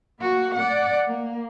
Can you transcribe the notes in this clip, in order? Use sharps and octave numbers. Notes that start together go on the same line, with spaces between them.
A#3 F#4
D5 F#5
A#3